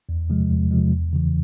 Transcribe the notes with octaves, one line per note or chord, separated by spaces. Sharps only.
E2
C3 F3 G#3
E2
C3 F3 G#3
E2
C#3 E3